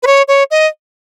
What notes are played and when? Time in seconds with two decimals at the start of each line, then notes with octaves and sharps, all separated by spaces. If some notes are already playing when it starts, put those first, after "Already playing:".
0.03 B4
0.07 C#5
0.28 C#5
0.51 D#5